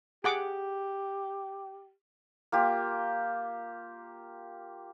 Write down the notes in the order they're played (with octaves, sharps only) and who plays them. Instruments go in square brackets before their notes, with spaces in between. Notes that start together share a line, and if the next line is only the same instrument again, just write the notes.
[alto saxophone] G4 [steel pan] G#4 F#5 D6
[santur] A#3 F4 G4